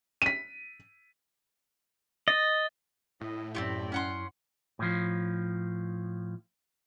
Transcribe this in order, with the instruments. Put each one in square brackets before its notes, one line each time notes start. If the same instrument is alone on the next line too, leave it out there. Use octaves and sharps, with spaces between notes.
[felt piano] B6 D#7
[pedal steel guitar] D#5 [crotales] A6
[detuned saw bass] A2 [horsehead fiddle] E4 D#5
[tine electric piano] F#2 E4 [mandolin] C4 F4 G4 [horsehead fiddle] D5 G5
[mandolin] C#4 F#5 C6
[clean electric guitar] A2 F3